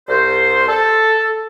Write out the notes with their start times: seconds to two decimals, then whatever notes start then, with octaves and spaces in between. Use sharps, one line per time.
0.09 C2 C5
0.69 A4